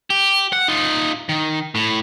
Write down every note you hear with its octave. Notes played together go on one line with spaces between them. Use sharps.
G4
F#5
D#4 F4
D#3
A2